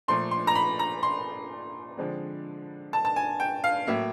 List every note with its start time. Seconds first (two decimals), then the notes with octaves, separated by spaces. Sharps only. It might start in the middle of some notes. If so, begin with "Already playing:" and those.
0.08 A#2 F3 A3 C6
0.31 C6
0.47 A#5
0.55 B5
0.79 A#5
1.03 C6
1.97 D3 F3 G#3 C4
2.93 A5
3.05 A5
3.16 G#5
3.40 G5
3.64 F5
3.87 A2 F#3 A#3 E5